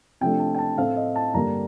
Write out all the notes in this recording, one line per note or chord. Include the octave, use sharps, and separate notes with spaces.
C3 F3 A3 D4 G5
A5
G5
A5
A2 A3 C4 F5
D#5
A5
G2 D3 G3 A#3 A#5